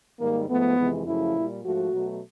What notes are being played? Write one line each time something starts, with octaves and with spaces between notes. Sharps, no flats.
G#2 D#3 G3 A#3
G#2 F3 A3 B3
F2 C3 E3 G#3
F#2 C#3 F3 A3 E4
A#2 G3
G#2 F3 A3 F#4
B2 F#3 A3